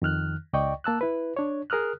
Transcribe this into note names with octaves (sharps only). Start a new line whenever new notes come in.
F2 D#3 F6 F#6
C#2 D5 D#5 G5 C#6
A#3 A5 E6 F#6
E4 B4
D4 C#5
G#4 A#4 D#6 F6 F#6